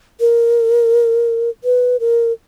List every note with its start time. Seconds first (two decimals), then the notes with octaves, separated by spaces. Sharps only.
0.20 A#4
1.64 B4
2.00 A#4